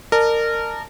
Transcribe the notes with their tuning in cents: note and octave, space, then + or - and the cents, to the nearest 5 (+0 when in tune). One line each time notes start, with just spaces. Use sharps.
A#4 -20 D5 +45 A5 -15